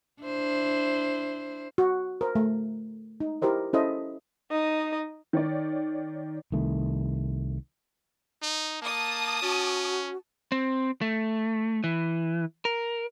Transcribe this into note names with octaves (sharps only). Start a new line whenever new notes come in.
D4 E4 C5
F#4
A#4 C5
A3
D#4
E4 G4 A#4 C5 D#5
C#4 E4 A4 C5 D#5 E5
D#4 D#5
D#3 C#5 D5
C2 D#3 A3
D#4
A#3 A5 D#6
C#4 F#4
C4
A3
E3
A#4